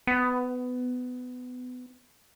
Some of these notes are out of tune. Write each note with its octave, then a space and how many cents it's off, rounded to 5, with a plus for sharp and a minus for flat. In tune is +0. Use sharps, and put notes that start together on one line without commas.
B3 +20